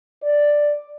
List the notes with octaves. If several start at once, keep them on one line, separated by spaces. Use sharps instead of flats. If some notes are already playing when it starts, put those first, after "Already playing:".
D5